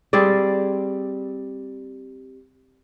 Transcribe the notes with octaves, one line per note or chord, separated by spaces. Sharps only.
G3 C4 G#4 D5